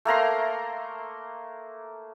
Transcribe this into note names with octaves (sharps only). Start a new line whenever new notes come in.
A3 A#3 A#5 C6